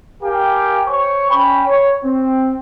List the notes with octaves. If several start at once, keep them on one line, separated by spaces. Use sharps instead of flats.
G4 A#4 F5 G5 G#5
C5 C#5 C#6
C#4 G5 B5
C#5
C4